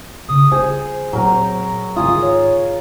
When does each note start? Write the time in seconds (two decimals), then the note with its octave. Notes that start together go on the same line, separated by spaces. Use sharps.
0.28 C#3 D#6
0.52 G3 F4 G#4 C5
1.13 A#2 F#3 C4 A#4
1.96 G#2 D#3 F4 G#4 D#6
2.23 C#5